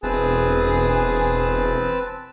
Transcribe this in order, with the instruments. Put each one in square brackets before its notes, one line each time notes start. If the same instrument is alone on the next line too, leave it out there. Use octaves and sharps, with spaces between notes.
[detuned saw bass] E1 [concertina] C4 B4 A5 [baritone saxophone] G#4